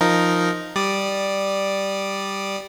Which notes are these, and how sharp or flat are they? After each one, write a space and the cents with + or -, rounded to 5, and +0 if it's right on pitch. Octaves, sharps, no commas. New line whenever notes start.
F3 +0 D#4 +0 A#4 +0
G3 +0 D5 +0 D#6 -20